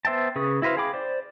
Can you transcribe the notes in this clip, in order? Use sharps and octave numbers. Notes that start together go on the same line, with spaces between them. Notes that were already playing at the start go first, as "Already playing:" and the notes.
B3 C5 E5 G5 A5
C#3 G#4 B4 C#6 D#6
E4 F#4 B4 C5 F5
G#4 F5 G5 B5 D6
C5 D5